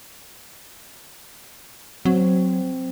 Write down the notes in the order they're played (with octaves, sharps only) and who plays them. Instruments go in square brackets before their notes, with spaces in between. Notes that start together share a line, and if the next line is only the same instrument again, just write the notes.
[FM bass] F#3 [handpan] C4